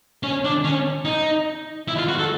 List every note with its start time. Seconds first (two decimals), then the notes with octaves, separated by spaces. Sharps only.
0.23 C#4
0.44 D4
0.64 C#4
1.05 D#4
1.88 E4
1.98 F4
2.08 F#4
2.19 A4